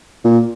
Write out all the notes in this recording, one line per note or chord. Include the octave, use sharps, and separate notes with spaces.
A#2